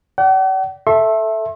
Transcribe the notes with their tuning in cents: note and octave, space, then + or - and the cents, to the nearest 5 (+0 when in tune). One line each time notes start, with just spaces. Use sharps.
D5 -25 F#5 +45
A4 +0 E5 +0 C6 +45